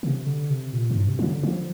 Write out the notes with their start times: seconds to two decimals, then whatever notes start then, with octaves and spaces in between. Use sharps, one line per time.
0.03 C3
0.26 D3
0.50 C3
0.73 A#2
0.91 G2
1.08 C3
1.19 F3
1.26 D3
1.43 F3